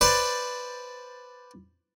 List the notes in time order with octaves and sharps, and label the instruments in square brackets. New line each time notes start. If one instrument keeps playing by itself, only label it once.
[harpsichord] B4 C5 D5 A5 B5 C6